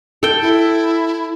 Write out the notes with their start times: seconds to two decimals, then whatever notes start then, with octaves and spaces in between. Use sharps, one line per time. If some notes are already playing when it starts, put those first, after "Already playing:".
0.23 A4 G5
0.42 E4